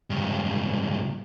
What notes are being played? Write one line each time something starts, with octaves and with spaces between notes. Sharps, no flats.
C#2 G2